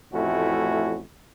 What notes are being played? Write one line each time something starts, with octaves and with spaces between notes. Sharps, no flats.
A1 F2 A3 C#4 E4 F#4